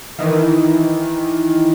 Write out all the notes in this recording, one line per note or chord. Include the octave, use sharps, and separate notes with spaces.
D#3 E3